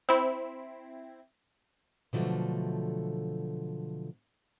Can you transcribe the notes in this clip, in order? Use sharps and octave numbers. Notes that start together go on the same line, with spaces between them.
C4 E4
B2 D3 F3 F#3 A3